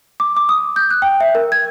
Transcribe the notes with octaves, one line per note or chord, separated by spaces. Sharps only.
D6
D6
D#6
G6
F#6
G5
E5
A#4
G#6